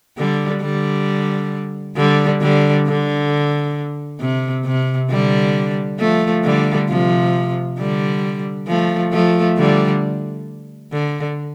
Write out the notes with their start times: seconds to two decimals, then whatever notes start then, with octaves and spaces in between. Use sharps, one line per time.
0.17 D3 G3
0.62 D3 G3
1.96 D3 G3
2.41 D3 G3
2.87 D3
4.20 C3
4.65 C3
5.10 D3 G3
5.99 F3 A3
6.44 D3 G3
6.89 C3 F3
7.78 D3 G3
8.67 F3 A3
9.12 F3 A3
9.57 D3 G3
10.92 D3